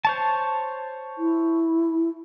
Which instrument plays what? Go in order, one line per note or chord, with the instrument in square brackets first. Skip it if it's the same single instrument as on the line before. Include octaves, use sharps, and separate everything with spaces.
[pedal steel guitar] C5 C#5 A5
[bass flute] E4